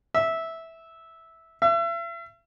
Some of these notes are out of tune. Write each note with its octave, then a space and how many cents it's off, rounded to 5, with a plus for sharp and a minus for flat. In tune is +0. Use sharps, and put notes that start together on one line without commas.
E5 -10
E5 +40